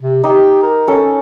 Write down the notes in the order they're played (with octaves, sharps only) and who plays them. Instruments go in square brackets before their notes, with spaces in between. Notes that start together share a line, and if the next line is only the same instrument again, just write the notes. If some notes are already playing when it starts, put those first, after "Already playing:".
[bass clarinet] C3
[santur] D#4 [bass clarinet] G4
[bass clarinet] A#4
[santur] C#4 A4